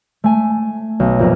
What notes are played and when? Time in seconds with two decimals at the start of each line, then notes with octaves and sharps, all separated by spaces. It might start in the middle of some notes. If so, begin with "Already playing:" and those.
0.24 A3 G#5
1.00 B1
1.19 A#1 F2 A#4 F5